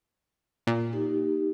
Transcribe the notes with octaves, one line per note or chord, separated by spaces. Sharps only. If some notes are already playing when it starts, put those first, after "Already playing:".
A#2
D#4 G4